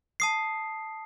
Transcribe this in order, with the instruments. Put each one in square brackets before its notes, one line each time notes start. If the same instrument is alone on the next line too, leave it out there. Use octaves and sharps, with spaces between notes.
[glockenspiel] A5 D#6 C7